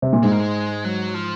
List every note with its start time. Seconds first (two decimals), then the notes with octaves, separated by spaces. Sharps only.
0.02 C3
0.13 A#2
0.23 G#2 G#3
0.32 A#3
0.40 G#3
0.84 F#3
1.14 F3